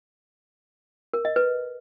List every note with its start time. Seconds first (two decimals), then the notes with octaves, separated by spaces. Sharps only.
1.14 A#4
1.25 D#5
1.36 B4